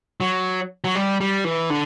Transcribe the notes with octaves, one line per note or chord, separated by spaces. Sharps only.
F#3
F#3
G3
G3
E3
D3